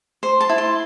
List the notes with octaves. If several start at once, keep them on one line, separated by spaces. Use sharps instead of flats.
C5 C6
A5
E4
C6